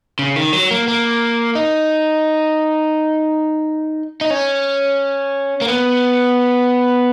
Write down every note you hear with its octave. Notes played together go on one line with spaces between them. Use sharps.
C#3
D#3
F#3
A#3
A#3
D#4
D#4
C#4
A#3
B3